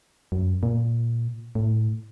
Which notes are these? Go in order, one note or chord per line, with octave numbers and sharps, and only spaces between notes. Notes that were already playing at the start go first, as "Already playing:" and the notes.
F#2
A#2
A2